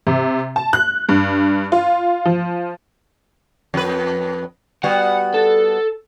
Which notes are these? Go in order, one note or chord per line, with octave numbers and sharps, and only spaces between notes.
C3
A5
F#6
G2
F4
F3
F2 B4
G3 B3 F#4 F#5
A4